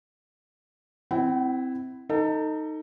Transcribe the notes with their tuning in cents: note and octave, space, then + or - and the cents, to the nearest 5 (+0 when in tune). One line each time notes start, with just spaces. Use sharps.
C4 -10 E4 +0 F#5 +40
D#4 +0 A4 +30